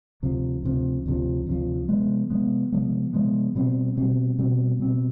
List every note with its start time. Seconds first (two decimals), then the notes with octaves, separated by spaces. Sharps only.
0.23 D2 C3 F3
0.63 D2 C3 F3
1.06 D2 C3 F3
1.47 D2 C3 F3
1.89 C3 F3 G#3 B3
2.30 C3 F3 G#3 B3
2.72 C3 F3 G#3 B3
3.13 C3 F3 G#3 B3
3.55 B2 G3 C4
3.97 B2 G3 C4
4.39 B2 G3 C4
4.80 B2 G3 C4